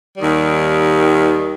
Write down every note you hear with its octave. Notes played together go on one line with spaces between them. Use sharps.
D#2 D#3 G3